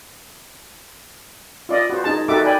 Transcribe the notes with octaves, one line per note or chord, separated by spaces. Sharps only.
F4 D5 D#5
F#4 C5
D#4 G#4 A5
D#4 F#4 G4 A4 E5 D6
D5 G5 G#5 B5